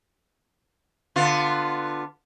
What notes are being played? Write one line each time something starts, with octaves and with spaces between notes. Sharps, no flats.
D3 B3 F4